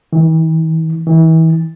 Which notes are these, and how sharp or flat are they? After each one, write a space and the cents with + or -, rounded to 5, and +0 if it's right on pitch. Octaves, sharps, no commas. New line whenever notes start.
E3 -45
E3 -35